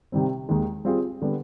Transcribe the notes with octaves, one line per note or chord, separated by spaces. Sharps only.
C3 D#3 G3 C4
D#2 D#3 G#3
G3 C4 F4 G#4
D3 G3 B3